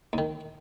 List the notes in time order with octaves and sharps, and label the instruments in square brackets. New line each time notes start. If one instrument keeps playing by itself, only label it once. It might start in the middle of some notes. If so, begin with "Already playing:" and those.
[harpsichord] D#2 D#3